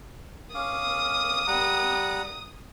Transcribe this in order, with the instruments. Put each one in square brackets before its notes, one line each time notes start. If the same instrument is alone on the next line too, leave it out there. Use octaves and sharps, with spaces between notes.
[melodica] C#4 F5 D6 [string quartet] D#6
[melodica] G3 F#5 A#5